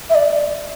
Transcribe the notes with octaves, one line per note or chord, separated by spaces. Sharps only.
E5
D5